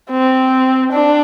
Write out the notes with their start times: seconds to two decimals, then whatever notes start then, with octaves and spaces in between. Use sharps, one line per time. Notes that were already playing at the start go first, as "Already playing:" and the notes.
0.11 C4
0.92 D4